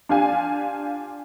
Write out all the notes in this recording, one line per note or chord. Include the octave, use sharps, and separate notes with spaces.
D4 F4 G4 F5 G#5